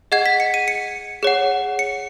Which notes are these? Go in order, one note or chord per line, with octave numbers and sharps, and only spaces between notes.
G#4 D#5 F#5 G#6
B6
C#7
D#7
C#7
G#4 C#5 F#5
C#7